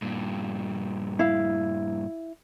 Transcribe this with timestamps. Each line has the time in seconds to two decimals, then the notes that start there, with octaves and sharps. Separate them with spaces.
0.02 G2 A#2
1.19 E4 F5